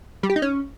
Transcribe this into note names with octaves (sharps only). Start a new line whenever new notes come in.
G3
G4
D#4
C#4